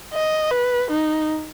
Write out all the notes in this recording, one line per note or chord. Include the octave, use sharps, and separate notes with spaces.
D#5
B4
D#4